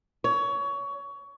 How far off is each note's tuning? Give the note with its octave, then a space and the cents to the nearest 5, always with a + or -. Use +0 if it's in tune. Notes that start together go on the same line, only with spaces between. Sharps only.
C#5 +20